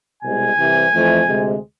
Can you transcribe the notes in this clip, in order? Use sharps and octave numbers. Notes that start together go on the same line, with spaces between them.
C2 B2 G#3 G#5
C2 C3 E3
F2 E3 A3
D2 C3 G#3